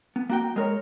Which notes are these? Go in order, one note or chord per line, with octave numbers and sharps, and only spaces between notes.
B3
A#3 F#4 G5
G#3 A#4 C#5